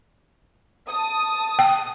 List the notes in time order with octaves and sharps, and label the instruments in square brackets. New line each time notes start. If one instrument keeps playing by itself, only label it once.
[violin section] A5 D#6
[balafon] G5